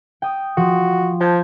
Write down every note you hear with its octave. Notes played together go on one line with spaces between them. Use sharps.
G5 D#6
F3 F#4
F3 A5 G6 G#6